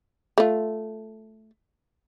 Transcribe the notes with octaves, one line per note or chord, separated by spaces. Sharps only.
A3 F4